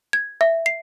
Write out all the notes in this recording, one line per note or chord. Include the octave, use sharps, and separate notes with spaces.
G#6
E5
C7